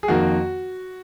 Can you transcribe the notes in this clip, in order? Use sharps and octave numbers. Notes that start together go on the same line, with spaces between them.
G#4
F2 D#3 A#3 F#4